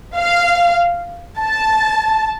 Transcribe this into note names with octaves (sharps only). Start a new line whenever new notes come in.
F5
A5